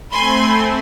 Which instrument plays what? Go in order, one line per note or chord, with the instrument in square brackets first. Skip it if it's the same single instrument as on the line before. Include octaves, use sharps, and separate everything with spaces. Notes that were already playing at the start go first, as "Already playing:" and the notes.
[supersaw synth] A3 C4 [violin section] G#5 C6 [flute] B5